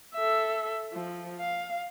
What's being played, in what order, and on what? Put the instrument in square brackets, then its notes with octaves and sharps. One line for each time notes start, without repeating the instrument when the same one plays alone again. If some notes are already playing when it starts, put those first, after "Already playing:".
[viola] A4 E5
F3
F5